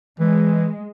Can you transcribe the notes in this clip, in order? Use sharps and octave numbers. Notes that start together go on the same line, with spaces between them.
E3 G#3